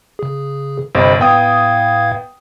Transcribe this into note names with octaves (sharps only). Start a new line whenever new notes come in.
C#3 G#4
G1 C3 C5 D#5 B5
A2 B3 F5 G5 D#6 G#6